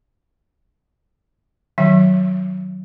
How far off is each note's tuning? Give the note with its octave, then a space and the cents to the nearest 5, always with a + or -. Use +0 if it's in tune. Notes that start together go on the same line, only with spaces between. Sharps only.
D#3 +0 F#3 +0 E5 +0